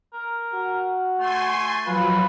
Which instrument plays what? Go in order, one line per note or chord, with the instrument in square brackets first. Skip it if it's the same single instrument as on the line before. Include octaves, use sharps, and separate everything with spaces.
[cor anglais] A#4
[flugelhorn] F#4
[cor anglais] A3 [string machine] G#5 C6
[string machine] F3 F#3 [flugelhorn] F4 [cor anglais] B4